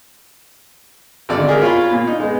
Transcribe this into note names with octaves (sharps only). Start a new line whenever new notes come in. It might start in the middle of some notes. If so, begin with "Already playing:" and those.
G#1 D3 D5
G4 G#4 A#4
F4 C#5 F5 B5
A#2
D#4
G#3 B3